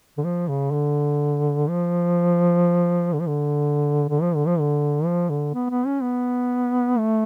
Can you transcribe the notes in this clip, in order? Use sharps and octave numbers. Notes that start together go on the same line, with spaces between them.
D3
F3
C#3
D3
F3
D3
F3
D3
D3
F3
D3
F3
D3
F3
D3
B3
B3
C#4
B3
A3